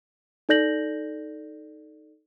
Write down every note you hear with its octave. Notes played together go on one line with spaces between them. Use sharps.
D#4 A4 D5 G6 A#6 F#7